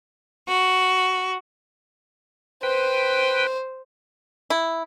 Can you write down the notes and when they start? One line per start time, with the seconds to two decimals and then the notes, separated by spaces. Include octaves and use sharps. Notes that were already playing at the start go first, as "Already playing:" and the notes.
0.49 F#4
2.63 B4 C5 G5
4.50 E4